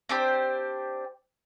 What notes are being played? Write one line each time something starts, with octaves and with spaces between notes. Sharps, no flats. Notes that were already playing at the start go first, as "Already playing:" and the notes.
C4 D4 G4 C5